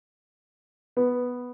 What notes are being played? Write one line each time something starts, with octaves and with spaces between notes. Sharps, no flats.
B3